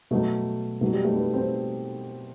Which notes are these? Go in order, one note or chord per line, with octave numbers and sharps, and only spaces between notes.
B2 F#3 A3
B2 F#3 A3
G3
A3
B3
C4